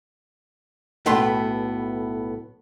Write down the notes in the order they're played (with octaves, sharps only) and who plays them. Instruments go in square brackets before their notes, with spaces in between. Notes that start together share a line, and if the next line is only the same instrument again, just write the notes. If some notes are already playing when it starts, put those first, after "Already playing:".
[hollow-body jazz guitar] B1 A2 A3 B3 C6